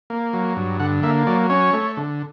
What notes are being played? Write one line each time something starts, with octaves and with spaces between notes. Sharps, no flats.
A#3
F#3
G2
D3 F#5
A#3 E5
F#3 D5
C#4 C#5
A3
D3